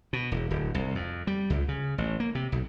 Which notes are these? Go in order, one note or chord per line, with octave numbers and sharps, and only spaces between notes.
B2
E1
D1
C2
F2
G3
C#2
C#3
A1
A#3
C3
B1